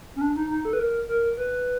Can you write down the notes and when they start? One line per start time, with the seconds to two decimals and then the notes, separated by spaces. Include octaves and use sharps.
0.16 C#4
0.21 D4
0.36 D#4
0.50 D#4
0.65 A4
0.73 B4
0.80 A#4
1.09 A#4
1.37 B4